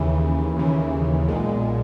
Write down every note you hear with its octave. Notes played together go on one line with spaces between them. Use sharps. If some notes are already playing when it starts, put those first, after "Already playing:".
Already playing: D#2 C#3 E3
D#2 C#3 E3
B1 A#2 G#3